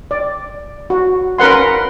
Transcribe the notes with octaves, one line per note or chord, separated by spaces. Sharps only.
D5
F#4
C#4 A#4 B4 F#5 C6